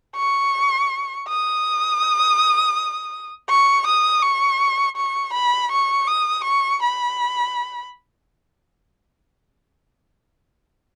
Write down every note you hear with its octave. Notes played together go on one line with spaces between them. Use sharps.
C#6
D#6
C#6
D#6
C#6
C#6
B5
C#6
D#6
C#6
B5